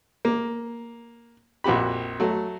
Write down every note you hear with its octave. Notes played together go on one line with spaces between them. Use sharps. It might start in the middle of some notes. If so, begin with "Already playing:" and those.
A#3
A#1 F2 F#4 G4 B5
F#3 A3